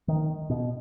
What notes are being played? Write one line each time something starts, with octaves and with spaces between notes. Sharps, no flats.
D#3
B2